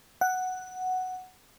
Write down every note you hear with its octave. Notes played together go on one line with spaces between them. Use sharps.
F#5